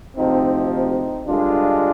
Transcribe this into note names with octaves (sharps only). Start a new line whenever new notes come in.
D2 C3 F3 C4 D#4
C4 D#4
G2 D3 G#3 D4 F4